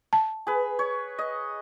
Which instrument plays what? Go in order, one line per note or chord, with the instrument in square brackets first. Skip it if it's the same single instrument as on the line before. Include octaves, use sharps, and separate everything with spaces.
[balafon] A5
[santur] G#4 B4
C#5
D#5